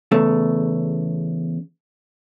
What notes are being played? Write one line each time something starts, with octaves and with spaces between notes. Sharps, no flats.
E2 C#3 A3